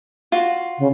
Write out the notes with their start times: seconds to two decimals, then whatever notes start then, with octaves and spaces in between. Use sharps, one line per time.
0.32 F4 F#4
0.78 C#3